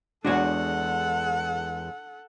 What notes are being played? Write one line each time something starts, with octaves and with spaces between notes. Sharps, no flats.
E2 G#3 D4 F#4 A4 C#5 F#5